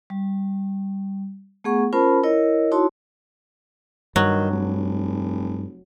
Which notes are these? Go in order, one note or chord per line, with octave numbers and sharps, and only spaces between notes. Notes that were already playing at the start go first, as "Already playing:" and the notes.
G3
A3 B3 G#4 F#5 C#6
C#4 F4 A#4 C5 A5 B5
E4 A#4 C#5 D#5
D#4 E4 F#4 C#5 A5 C6
G2 D#3 F#3
F1